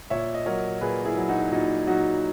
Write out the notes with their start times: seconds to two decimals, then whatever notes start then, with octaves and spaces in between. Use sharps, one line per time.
0.10 A#2 C#5 E5
0.34 D#5
0.46 F#3 A#4 C#5
0.81 A#2 G#4 B4
1.05 E4 G#4
1.17 F#3
1.29 D#4 F#4
1.52 A#2 D#4 F#4
1.87 F#3 D#4 F#4